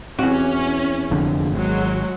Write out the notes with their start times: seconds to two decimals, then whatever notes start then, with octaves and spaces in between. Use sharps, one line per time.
0.19 E2 C4 C#4 F#4
1.11 F1 F2 D3
1.52 G#1 F#3 G#3